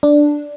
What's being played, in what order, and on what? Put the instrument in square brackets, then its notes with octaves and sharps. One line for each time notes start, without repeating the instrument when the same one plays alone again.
[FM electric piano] D4